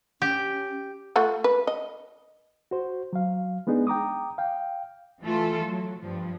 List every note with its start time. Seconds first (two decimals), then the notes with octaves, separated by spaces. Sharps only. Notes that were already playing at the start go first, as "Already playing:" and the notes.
0.22 C#4 G4
1.16 A3 F4 F#5
1.44 B4
1.67 D#5
2.71 F#4 C5
3.13 F#3 F5
3.67 G#3 B3 D4 D#4 G#4
3.87 G5 A#5 D6 D#6
4.38 F5 G5
5.22 E3 A3 F4 A4
5.64 F#3
6.00 G2 F3